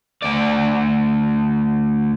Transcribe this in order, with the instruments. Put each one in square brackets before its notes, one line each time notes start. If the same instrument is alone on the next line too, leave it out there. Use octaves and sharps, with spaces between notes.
[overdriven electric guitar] D2 D5